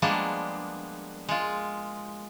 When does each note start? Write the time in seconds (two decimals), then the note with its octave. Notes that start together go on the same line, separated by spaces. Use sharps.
0.02 F3 G3 G#3 A#3 B3 D4
1.29 G#3 F4